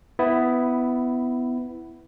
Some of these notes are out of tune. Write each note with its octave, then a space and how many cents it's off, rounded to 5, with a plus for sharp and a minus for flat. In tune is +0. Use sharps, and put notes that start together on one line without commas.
B3 +15 E4 +0